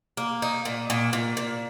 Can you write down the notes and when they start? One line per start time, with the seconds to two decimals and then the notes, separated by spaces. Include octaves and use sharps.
0.17 A#3
0.42 D#4
0.65 A#2
0.90 A#2
1.13 A#2
1.37 A#2